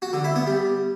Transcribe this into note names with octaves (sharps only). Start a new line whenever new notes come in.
F#4
D3
E4
B3
G3